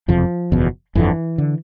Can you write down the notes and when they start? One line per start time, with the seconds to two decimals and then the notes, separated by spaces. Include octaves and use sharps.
0.08 F#1 F2 C3 F3
0.52 F#1 E2 B2
0.95 G1 F2 D3 E3
1.38 D3